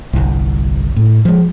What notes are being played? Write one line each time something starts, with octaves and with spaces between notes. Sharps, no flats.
G1 C2
A2
F3 G#3